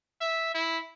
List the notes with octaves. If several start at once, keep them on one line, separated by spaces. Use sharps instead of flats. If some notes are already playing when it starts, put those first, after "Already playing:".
E5
E4